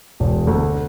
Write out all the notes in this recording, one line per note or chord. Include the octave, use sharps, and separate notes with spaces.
E1
D2